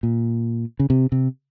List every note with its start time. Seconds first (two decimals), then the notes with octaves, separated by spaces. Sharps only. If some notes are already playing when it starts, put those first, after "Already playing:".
0.03 A#2
0.79 C#3
0.90 C3
1.12 C3